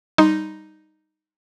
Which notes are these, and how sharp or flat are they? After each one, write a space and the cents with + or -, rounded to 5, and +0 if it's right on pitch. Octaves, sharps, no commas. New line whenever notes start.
G3 +0 D#4 +0 C6 +0